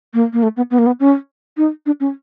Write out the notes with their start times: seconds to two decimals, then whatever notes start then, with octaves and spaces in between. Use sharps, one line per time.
0.14 A#3
0.33 A#3
0.43 A3
0.57 B3
0.71 B3
0.79 A#3
0.86 B3
1.00 C#4
1.57 D#4
1.86 D4
2.00 C#4